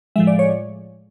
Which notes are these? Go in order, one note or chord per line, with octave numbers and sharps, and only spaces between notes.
A2 F3 G#3 E5
D5
C#5